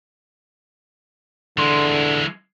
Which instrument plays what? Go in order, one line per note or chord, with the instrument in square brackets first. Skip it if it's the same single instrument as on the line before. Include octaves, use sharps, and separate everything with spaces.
[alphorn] D3 [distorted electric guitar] E3 G#3 [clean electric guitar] C6